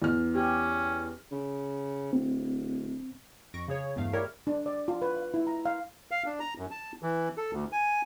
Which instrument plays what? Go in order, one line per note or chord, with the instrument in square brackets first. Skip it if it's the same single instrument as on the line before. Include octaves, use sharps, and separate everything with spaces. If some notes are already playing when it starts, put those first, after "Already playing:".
[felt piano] E2 F6
[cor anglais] C#4 [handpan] G4
[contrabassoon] C#3
[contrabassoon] D1 [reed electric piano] C4
[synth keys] F2 C#6 A#6 D7
C#3 G#4 C#5
E2 G2 A3 F5
E4 G4 A#4 C#5 D5 E5
[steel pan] D4
D5
F4
B4
F5
E4
A#5
F5
[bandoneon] F5
D4
A#5
F#2
A5
E3
A4
D2
G#5